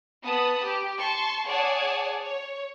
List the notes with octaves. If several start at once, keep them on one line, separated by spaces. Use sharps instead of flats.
B3 A5 B5 D#6
G4
A5 C6 C#6
G#4 C#5 D5 F#5 G#5 A5
C#5